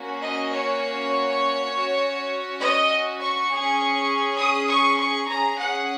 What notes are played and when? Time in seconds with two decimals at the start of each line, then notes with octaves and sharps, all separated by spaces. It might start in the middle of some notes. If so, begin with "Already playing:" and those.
Already playing: A#3 C#4 F#4
0.21 D#5
0.52 C#5
1.71 C#4 F#4
2.61 D#5
3.20 C#6
3.49 C#4 G#4
4.38 D#6
4.69 C#6
4.98 C#6
5.28 C#4 G#4 A#5
5.58 F#5